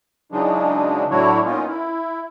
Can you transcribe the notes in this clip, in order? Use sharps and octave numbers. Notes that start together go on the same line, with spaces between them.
C#3 E3 F#3 G#3 D4 D#4
A2 F#3 D4 E4 F#4 C#5
A#3 B3 C#4 D#4 F4
E4